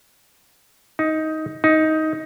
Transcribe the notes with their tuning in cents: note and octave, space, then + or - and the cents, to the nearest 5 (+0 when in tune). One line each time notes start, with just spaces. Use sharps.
D#4 +15
D#4 +15